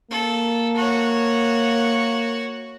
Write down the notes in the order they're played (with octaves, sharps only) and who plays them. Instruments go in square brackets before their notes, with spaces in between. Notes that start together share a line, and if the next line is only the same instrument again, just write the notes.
[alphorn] A#3 [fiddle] A4
[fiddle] F#4 C#5